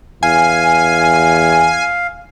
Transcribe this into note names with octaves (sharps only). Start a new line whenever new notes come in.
E2 F5 G#5